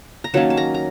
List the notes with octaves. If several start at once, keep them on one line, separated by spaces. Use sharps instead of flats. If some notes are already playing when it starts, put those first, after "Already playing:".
A#5
D#3 F#3 A#3 C#4 A5
A5
A#5
A#5